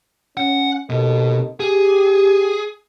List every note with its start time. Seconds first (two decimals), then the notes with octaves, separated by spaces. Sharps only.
0.37 C#4 F#5
0.90 D#2 B2 A4 D#5
1.60 G4 G#4